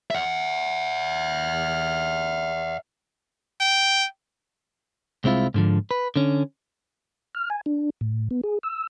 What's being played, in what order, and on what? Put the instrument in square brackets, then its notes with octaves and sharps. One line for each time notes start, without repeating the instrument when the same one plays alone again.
[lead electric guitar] E5 F#5
[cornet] G5
[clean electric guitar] C2 G#3 C4 E4 F4
G#2 D3 F3
B4
D3 C#4
[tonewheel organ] F6
G#5
D4
A2
B3
G#4
E6